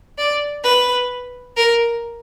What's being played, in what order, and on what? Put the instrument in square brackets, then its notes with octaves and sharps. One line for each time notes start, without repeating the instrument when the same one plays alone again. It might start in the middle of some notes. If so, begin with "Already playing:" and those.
[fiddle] D5
B4
A#4